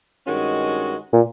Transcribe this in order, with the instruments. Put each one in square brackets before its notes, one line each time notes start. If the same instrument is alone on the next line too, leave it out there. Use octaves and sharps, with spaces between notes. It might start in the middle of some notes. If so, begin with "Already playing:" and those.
[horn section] G2 D#3 G#3 C#4 F#4
[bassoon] A#2